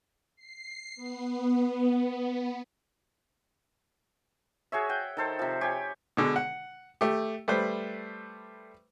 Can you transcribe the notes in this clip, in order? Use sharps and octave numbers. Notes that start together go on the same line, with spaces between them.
C7
B3
F#4 G#4 C#5 E5
F#5 G5
D#3 A4 C5
C3 F3
G4 C#5 G#5
B2 D3 G#3
F#5
A3 G4
G3 A3 B4 C5